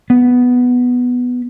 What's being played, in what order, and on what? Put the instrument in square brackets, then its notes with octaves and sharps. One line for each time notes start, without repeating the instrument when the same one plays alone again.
[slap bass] B3